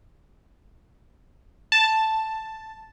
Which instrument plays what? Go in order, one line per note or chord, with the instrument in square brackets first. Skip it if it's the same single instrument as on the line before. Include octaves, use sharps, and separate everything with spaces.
[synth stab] A5